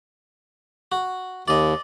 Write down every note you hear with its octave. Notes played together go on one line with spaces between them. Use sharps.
F#4
D#2 D5 D#5